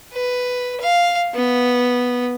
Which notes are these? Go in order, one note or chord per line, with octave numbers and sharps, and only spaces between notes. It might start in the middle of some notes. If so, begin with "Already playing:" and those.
B4
F5
B3